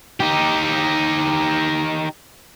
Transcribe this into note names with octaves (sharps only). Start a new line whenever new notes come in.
D#4 G4